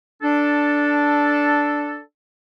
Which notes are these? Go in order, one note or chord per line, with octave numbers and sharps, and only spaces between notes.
D4 A4